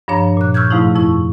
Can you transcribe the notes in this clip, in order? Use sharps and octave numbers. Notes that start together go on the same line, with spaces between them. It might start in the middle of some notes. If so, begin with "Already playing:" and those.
G2 F3 D4 C#5 A#5
A#2 F#6
C#6 E6 F6 G6 G#6
G#2 C3 F3 A3 D#4 E4
F2 E4 C#6